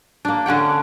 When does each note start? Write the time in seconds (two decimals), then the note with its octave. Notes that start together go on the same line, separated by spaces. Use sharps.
0.25 A#3 D4
0.46 D3 C#4 F#5 G5